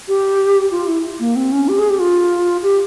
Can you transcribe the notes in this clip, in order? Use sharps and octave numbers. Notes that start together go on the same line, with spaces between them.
G4
F4
E4
A#3
C4
C#4
G4
G#4
G4
F4
G4